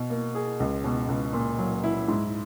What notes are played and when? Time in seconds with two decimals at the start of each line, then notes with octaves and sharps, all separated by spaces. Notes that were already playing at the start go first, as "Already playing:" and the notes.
Already playing: B2
0.10 A#3
0.35 G#4
0.60 C#2
0.84 B2
1.08 C#2
1.33 A#2
1.58 F#3
1.84 E4
2.08 G#2